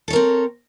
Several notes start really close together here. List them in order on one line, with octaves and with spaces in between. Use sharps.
A4 C#5 A#4 C4